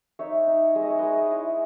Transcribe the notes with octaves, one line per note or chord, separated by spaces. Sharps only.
D#4 C#5 E5
D#4
G#3 E5
D#5
C#5
G#3 B4 D#5
E4